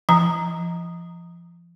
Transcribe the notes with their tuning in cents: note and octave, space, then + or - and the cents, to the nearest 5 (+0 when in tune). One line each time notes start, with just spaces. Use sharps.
F3 -30 A#5 +0